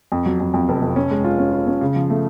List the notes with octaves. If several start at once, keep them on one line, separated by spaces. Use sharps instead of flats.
F2
F#3
F2
F2
F1
F1
C#4
G#3
F4
C#4
F4
C#4
C#3
F3
A3